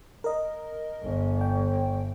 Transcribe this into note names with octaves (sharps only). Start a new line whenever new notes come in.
A#4 D#5
G1
G5